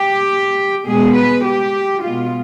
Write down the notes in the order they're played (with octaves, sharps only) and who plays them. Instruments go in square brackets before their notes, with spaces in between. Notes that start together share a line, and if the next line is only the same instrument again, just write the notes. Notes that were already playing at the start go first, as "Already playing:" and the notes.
Already playing: [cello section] G4
B2 G#3 B3 G#4
B4
G4
B2 G#3 B3 F4